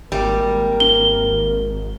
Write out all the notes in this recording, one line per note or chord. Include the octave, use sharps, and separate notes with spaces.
G#1 G3 A#3 A#4
G7